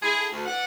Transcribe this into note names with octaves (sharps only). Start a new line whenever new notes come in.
G#3 E4 G#4
D3
D2
E3 D5 F#5